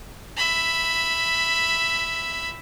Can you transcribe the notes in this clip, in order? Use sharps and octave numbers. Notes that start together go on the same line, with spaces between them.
E5 B5